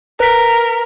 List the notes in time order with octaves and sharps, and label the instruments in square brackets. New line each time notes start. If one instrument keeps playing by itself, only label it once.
[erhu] A#4 [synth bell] B4 B6